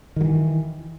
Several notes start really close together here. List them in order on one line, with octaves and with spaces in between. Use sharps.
D#3 F#3 E3